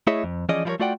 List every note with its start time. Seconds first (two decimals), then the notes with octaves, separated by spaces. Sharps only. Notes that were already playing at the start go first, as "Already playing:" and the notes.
0.07 A3 E4 G#4 C#5 D#5 E5
0.24 F2
0.49 E3 F3 C#4 G#4 D5 D#5
0.65 F3 G3 E4 G#4 A#4 C#5
0.80 A3 F4 F#4 D5 F#5 G5